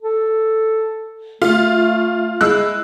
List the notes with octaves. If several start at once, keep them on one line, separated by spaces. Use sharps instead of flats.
A4
A3 F4
G#3 E4 E6 F#6